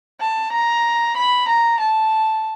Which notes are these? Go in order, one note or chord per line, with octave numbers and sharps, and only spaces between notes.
A5
A#5
B5
A#5
A5